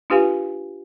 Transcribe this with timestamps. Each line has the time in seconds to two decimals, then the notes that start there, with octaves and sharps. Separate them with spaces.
0.10 D4 F4 G4 B4 F5 G#5